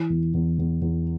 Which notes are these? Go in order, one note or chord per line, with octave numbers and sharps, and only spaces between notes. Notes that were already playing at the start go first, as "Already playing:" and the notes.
Already playing: E3
E2
E2
E2
E2